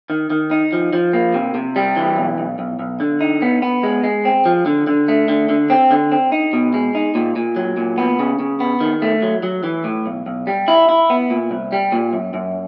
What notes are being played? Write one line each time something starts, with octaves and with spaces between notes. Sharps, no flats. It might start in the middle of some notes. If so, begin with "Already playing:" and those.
D#3
D#3
D#4
F3
F3
A#3
C3
C3
G3
E3
B1
B1
B1
B1
D3
D#4
B3
B3
G#3
G#3
C4
F3
D3
D3
A3
D3
D3
C4
D3
C4
D#4
B2
G#3
D#4
A#2
A#2
F#3
A#2
B3
C#3
C#3
B3
D#3
A3
F#3
F#3
E3
A2
B1
B1
G3
E4
E4
B3
A#2
C2
G3
A#2
F#2
F#2